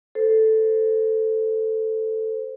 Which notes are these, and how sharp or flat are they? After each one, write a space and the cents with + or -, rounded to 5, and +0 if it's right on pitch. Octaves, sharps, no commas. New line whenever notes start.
A4 +0 C5 -5